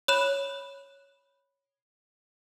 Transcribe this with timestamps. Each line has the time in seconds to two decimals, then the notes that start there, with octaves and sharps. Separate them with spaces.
0.08 C#5 B5 F#6 E7